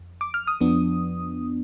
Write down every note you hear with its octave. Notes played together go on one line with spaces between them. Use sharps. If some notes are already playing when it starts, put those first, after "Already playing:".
Already playing: F2
D6
F6
D#6
F2 F3 B3 D4